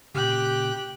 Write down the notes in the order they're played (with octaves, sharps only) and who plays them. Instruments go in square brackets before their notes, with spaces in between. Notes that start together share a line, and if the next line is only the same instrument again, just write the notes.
[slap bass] A#2 C#3 [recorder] G4 [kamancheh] G5 F#6